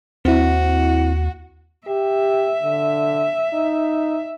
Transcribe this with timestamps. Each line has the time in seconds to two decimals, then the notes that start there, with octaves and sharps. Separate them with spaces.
0.25 D#2 C4 E4 F#4
1.87 G4 E5
2.62 D3
3.54 D#4